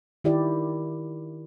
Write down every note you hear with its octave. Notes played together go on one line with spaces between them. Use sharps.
D#3 E4 G4 D5